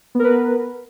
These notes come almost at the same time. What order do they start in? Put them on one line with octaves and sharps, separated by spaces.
B3 A#4 B4